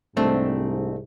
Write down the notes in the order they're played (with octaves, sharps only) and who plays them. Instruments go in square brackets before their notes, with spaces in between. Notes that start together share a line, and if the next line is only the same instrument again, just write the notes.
[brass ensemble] C2 G#2 [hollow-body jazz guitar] A3 C4 D4